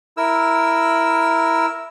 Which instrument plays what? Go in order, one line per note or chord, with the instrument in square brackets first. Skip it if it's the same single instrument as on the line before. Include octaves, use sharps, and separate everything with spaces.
[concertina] E4 A#4 E6